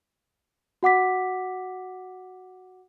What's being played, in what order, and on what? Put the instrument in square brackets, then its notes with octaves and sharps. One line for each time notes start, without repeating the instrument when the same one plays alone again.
[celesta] F#4 F#5 D6 B6